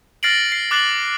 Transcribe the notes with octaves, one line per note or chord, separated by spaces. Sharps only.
F6 A6 A#6 C7 D7 F#7
C7
D6 F#6 A6 C7 F#7